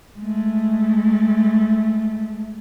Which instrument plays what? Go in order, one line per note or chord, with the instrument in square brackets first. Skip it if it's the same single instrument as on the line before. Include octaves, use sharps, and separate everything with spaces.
[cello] G#3 A3